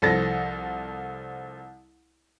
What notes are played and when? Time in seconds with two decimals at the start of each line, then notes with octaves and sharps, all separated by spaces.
0.02 C2 F3 A4 A6 A#6